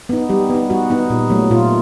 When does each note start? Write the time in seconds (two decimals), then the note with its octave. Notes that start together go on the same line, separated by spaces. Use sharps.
0.09 B3 D#4
0.29 G3 G4
0.50 B3 D#4
0.70 G3 F#4
0.90 B3 D#4
1.10 A#2
1.30 F#3 A3
1.51 A#2 F4